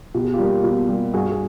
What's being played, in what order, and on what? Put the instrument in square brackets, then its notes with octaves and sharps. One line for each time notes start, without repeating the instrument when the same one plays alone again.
[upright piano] B2 G4
G#4
F4 G4
G3 A#3
B2
G3 A#3
G2 F#4 G#4
G#4